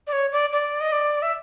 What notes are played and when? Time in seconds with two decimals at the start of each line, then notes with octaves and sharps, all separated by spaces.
0.07 D5
0.13 C#5
0.32 D5
0.52 D5
0.81 D#5
0.92 D5
1.22 E5